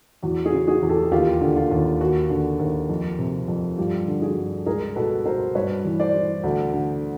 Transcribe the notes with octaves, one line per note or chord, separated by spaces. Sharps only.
E2 F#4
F#4 G#4
C#3
F#4 G#4
E2
G4 A4
D#2 F4 G4
D3
F4
D#2
D#2 F#4
D3
D#2
F2
C3
F2
G2 F4 G4
D3
F#4 G#4
G2
C#2 G#4 A#4
B2 A4 B4
B2 A#4 C5
G2 B4 C#5
E3
C5 D5
E3
D2
D3